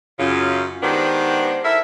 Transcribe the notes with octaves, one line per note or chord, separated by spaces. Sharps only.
F#2 C#3 F4
D#3 G#3 B3 D4 G4 C5
E4 A4 A#4 E5